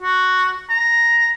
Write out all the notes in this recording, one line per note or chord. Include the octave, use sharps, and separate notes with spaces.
F#4
A#5